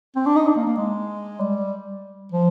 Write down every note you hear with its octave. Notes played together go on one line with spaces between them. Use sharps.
C4
D4
D#4
D4
A#3
A#3
G#3
G3
F3